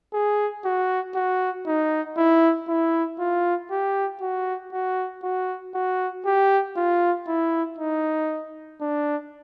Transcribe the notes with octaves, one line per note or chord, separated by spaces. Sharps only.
G#4
F#4
F#4
D#4
E4
E4
F4
G4
F#4
F#4
F#4
F#4
G4
F4
E4
D#4
D4